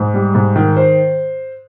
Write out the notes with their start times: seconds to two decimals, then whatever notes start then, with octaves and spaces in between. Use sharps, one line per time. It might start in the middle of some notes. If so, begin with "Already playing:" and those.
Already playing: G#2
0.14 G3
0.35 G#2
0.56 D#3
0.76 C5